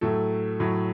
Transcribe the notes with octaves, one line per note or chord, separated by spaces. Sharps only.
A2 F#3 A3 A4
A2 F#3